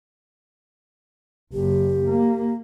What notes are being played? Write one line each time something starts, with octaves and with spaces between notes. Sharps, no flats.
F#1 G4
A#3